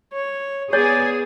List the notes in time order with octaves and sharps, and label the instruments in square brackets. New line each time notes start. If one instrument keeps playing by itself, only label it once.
[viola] C#5
[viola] B3 [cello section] G#4 [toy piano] C#5 [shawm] D5